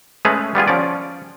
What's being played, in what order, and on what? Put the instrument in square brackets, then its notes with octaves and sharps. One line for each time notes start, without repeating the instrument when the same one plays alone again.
[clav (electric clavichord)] G#3 A3 C#4 G#4 B4 C#5
G3 B3 F4 G#4
F3 C#4 D5